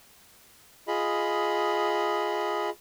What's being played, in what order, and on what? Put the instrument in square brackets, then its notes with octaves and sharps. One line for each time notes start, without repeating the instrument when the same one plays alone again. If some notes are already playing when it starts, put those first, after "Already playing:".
[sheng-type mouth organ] F4 G#4 D#5 B5